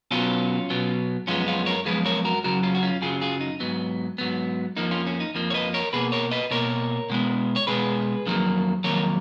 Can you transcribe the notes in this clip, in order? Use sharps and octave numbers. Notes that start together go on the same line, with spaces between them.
B2 F#3 B3 C#4 F4
B2 F#3 B3
F#2 F3 G#3 B3 C#4 F4
C#4 F4
A#4 C#5
F#2 F3 G#3 B3 G#4 B4
A#4 C#5
F#4 A#4
F#2 C#3 F#3 F#4 A#4
C#4 F4
F#4
C#4 F4
F#2 C#3 F#3 F4 G#4
F4 G#4
D#4
G#2 F#3 B3
G#2 F#3 B3
F2 F3 A#3 D#4
C#4 F4
C#4
D#4
F2 F3 A#3
C#5
B4 D#5
A#4 C#5
B2 A#3 G#4 B4
A#4 C#5
B4 D#5
B2 A#3 A#4 C#5
B2 G#3 B3
C#5
B2 G#3 B3 G#4 B4
F2 D#3 F#3 A#3
F2 D#3 F#3 A#3 A#4 C#5